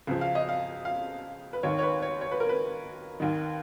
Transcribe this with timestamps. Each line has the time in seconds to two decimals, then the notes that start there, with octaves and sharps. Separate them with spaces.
0.07 C#2 C#3 F3
0.21 F5
0.35 D#5
0.49 F5
0.85 F5
1.53 B4
1.63 D#2 D#3 C#5
1.79 C#5
1.83 B4
2.02 C#5
2.21 C#5
2.31 B4
2.40 A#4
2.49 B4
3.20 D#2 D#3